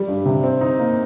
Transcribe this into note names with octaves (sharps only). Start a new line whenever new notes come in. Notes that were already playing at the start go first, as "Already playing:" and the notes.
Already playing: G3 G4
G2
C3
C4
D#4
A#3